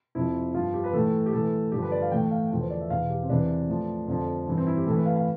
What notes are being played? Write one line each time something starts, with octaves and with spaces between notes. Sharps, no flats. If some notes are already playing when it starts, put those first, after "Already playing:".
F2 C3 F3 E4
G2 F3 F4
G4
B4
A2 E3 A4
G4
A2 E3 A4
G2 D3 F3 G4
B4
D5
F5
A2 E3 G5
F5
E2 D3 F3
C5
D5
E5
E2 B2 F5
G4
C4
E2 C3 E3 D4
A2 F3
F2 D3 F3
G2 E3
C4
E4
G4
A2 E3 A4
B4
F5
F5